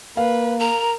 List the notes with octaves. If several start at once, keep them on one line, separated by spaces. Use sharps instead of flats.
A#3 B4 F5
A#4 A#5